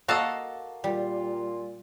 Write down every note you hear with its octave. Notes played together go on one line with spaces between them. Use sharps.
A#3 F#4 A4 D#5 F5 A5
A#2 G3 F4